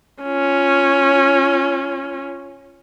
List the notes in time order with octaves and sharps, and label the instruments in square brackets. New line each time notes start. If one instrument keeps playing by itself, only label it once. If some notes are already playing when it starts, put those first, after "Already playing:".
[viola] C#4 F4